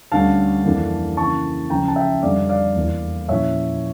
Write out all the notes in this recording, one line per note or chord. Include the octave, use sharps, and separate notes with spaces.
D2 D3 G3 C#4 F5 A5
F2 E3 A#3 D4
C#3 E3 A#3 A5 C#6
C#2 C#3 F3 G5 A#5
A5
E5 G5
F2 D3 G3 D4 D5 F5
D5 F5
E2 E3 A#3 E4
A#2 F3 C#4 E4 C#5 E5